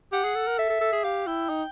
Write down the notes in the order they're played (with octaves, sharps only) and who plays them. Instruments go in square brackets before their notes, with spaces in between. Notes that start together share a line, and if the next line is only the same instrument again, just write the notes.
[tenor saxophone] G4 [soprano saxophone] F#5
[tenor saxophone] G#4
A4
A#4
[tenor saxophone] A4 [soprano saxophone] E5
[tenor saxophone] A4
A4
G#4
[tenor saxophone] G4 [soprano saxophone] F5
[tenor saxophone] E4 [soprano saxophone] G5
[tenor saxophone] D#4